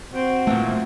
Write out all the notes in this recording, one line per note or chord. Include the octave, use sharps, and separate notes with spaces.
C4 F#4
A#2 E3 A3